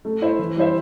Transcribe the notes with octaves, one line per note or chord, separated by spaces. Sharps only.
A3
E4 C5 E5
E3
G3 E4 C5 E5